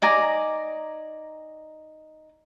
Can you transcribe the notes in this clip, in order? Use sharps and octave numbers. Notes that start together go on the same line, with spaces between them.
D#4 D5 G#5 A#5